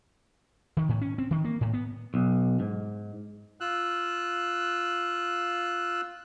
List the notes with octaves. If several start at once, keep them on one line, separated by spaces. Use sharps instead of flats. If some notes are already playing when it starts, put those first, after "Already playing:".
D#3
A2
C#4
C4
D#3
A#3
A2
B3
B1
G#2
F4 E6 F#6